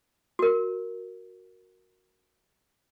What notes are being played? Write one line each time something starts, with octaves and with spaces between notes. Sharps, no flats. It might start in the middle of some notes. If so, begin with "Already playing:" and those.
F#4 A#4